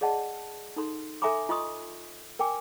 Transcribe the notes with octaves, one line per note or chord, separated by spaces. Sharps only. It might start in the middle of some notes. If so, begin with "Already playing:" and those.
G#4 D5 D#5 F#5 A5
D#4 A4 C6
A4 E5 G#5 A#5 C6 D6
F4 D#5 C6 C#6 D#6
A#4 G5 G#5 D6